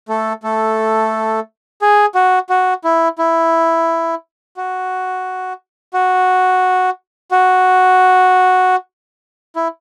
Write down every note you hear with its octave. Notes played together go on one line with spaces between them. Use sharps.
A3 A4
A3 A4
G#4
F#4
F#4
E4
E4
F#4
F#4
F#4
E4